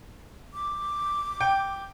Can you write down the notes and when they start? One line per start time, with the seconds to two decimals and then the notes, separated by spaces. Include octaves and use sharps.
0.54 D6
1.41 G5